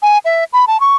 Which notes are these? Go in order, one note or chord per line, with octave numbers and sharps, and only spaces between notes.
G#5
E5
B5
A5
C#6